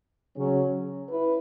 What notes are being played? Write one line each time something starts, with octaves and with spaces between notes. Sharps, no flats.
C#3 F#3 C#4
E4 B4